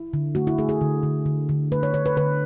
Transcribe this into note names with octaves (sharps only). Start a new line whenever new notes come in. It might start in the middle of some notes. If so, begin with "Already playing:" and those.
Already playing: E4
D3
A3 F#4
E4
A3 G#4
G#4
D3
D3
D3
D3
A3 B4
C#5
D3 C#5
B4
D3 B4